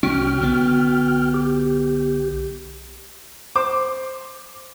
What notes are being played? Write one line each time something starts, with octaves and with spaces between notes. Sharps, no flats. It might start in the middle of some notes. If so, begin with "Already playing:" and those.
C2 C3 C#4 F#4 G5 F6
B1 D3 B3
G4
C5 D6